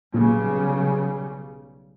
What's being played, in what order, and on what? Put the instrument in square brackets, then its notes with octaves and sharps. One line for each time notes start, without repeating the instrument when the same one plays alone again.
[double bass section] B1 C#3 G3 [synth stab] A#2